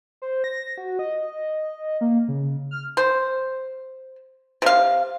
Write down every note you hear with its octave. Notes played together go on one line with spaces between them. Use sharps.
C5
A#6
F#4
D#5
A#3
C#3
F6
C5
C3 F5